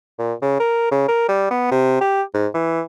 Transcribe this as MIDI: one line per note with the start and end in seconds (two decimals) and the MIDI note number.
0.19 0.33 46
0.42 0.57 49
0.59 0.87 70
0.91 1.06 49
1.08 1.25 70
1.28 1.50 55
1.51 1.67 59
1.71 2.00 48
2.01 2.22 67
2.34 2.47 44
2.54 2.81 52